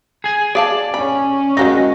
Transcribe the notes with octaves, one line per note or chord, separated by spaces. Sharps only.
G#4 G#5
G#4 D5 F5 A5
C#4 B5
D#3 G#3 A#3 D#4 F#4 A#6